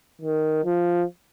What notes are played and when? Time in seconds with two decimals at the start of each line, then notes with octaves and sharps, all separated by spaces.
0.21 D#3
0.64 F3